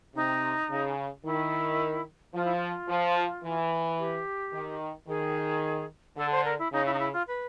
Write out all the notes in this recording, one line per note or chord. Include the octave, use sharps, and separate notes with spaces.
C3 D#4
C#3
D#3 E4
F3 F4
E4
F4
F3
E3
G4
D#3
D#3 G#4
D3 A4
C5
A#4
E4
C#3 D#4
E4
D#4
E4
F4
B4